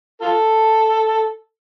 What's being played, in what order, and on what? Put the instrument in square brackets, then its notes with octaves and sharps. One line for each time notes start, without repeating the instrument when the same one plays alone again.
[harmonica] F4 A4